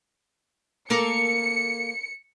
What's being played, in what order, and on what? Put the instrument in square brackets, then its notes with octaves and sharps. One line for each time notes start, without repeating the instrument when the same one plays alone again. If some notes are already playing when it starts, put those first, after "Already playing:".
[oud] A#3 A4 A#4 [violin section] C#7